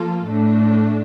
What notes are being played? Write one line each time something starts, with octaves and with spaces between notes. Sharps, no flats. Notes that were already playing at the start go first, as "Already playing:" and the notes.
Already playing: F3 A#3 F4 A4
A2 A3 D4